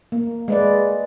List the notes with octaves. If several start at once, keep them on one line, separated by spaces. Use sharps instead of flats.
A#3
G#3 B4 D5